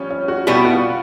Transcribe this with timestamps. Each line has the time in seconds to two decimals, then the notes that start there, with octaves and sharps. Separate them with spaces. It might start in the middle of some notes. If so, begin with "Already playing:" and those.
Already playing: F3 G3 C#4
0.11 C#4
0.28 F#4
0.47 B2 G3 B3 E4 F#4
0.65 F#4
0.71 F4